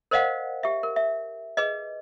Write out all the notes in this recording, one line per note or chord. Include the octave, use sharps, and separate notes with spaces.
A#4 C5 D5 D#5 F5 F#5
G4 E5
A#4
E5
G#4 B4 D#5